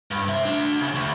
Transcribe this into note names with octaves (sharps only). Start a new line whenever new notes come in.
G2
C3 E5
A3 D4
C#3
D2